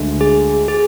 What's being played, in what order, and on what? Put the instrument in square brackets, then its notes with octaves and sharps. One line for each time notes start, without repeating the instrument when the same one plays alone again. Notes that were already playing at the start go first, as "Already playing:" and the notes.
Already playing: [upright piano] D2 D3 G#3
[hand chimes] G#4
G#4